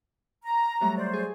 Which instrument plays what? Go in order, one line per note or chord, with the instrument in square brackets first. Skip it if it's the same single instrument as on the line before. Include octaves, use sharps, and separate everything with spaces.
[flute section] A#5
[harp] F#3 G3 A3
[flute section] C5 D5
[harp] G#4